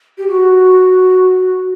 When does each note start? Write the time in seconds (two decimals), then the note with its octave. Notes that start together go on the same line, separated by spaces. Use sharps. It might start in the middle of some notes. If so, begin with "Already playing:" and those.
0.18 G4
0.28 F#4